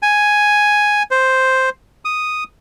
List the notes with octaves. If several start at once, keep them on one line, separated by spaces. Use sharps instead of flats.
G#5
C5
D#6